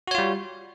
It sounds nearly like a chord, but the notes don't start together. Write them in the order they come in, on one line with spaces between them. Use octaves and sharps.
F#4 C#5 F4 G3